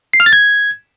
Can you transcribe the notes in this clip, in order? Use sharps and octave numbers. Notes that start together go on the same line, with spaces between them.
C7
F6
A6
G#6